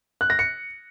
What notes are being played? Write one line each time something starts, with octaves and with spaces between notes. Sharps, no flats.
F#6
A#6
C#7